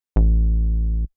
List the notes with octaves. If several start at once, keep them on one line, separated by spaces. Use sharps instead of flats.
A1